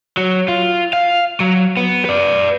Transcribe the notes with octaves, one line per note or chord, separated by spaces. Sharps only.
F#3
F4
F5
F#3
B3
B4 D5